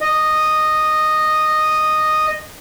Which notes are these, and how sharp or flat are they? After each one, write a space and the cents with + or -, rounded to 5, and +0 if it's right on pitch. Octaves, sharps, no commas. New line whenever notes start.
D#5 -10